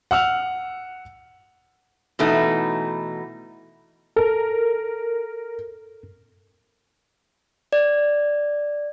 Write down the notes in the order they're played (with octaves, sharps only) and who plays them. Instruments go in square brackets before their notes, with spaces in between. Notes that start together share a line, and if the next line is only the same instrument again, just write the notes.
[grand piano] F#5 E6 F6 F7
[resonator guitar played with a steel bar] B2 E3 A3 D#4
[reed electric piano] A4 [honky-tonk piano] A#4
[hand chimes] D5